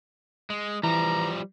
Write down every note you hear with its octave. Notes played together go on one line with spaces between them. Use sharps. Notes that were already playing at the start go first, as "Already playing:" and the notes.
G#3
E3 F3 G3 B4 A#5